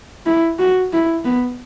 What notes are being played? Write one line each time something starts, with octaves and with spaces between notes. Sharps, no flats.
E4
F#4
E4
B3